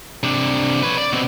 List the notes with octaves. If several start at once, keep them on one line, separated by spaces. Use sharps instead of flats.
C3 D4
B4 C#5
D5
B2 C4